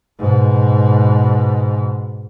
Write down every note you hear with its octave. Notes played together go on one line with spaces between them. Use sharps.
G#2 B2